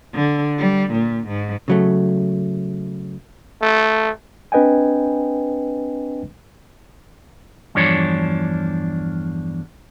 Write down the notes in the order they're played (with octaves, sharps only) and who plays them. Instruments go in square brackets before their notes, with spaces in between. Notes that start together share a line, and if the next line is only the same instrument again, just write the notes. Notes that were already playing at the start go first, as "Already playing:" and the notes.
[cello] D3
G3
A#2
G#2
[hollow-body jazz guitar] C#3 F#3 A3
[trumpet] A3
[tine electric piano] C4 D4 B4 D#5 G5 G#5
[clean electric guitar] E2 G2 F3 D4 C#5